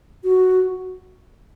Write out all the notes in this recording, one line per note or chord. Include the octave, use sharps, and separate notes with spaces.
F#4